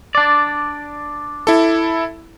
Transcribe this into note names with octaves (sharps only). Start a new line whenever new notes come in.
D4 D5
E4 A4